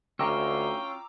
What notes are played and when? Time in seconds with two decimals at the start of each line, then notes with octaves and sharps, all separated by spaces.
0.19 D2 C#4 F4 G5 A#5 D6 E6